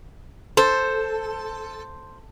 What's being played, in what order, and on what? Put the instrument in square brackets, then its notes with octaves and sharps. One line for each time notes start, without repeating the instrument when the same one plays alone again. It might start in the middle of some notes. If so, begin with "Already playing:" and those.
[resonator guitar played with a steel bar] A4 [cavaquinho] C5